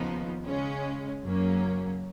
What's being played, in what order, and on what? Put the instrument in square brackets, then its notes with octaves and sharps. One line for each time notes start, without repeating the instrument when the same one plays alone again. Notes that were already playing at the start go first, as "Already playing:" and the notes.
Already playing: [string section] D#2 C#3 F3 B3 D#4
C#3 G#3 C#4
F#2 C#3 F#3 A#3 C#4